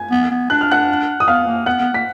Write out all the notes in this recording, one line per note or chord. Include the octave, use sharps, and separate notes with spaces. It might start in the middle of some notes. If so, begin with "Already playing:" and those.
Already playing: G#5 G#6
B3
B3
D4 F#6
F6
F#5 F#6
D#6
B3 F5 F6
A#3
B3 F#5 F#6
B3
A#3 B6